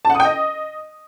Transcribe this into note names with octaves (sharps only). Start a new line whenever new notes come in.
A5
F#5
D#6
G5
D#5